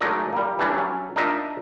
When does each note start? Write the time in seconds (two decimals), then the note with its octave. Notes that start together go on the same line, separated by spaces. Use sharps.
0.01 F#3 G#3 A3 D#4 A#4 D5
0.33 G3 A#3
0.59 E3 G3 C#4 D4
0.75 F#3 C#4
1.16 D4 D#4 F4 A#4 D#5 E5